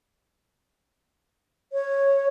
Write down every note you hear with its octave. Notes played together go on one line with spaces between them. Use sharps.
C#5